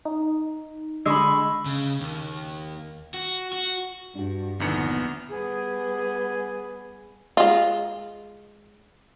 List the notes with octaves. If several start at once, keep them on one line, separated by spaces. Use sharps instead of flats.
D#4
D3 G#3 B5 C#6 E6
C#3
D#2
F#4
F#4
G2 D4 F#4
A#1 E2 D3 D#3 B3 C#7
G3 B3 G#4
G#3 F4